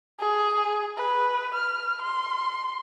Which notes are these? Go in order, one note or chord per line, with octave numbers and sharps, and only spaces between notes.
G#4
B4
F6
C6